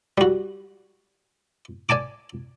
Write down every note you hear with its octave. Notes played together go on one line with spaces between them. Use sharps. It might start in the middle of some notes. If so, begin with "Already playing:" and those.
G3 F#4
D5 G#5 A5 D6